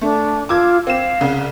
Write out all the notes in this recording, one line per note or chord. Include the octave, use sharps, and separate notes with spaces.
A3 D4
F4 D6 E6 G#6
C4 F5 E7
C2 C#3